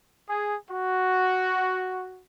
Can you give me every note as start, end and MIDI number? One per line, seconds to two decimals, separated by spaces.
0.29 0.55 68
0.70 2.21 66